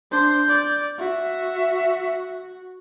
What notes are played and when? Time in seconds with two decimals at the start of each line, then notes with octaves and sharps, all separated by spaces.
0.11 D4 C5 G6
0.48 D5
0.98 F#4 E5